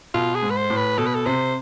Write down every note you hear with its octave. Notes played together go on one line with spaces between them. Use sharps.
B2 F4
G#4
G#2
B4
C5
A2
B4
B2 A4
B4
A4
C3 C5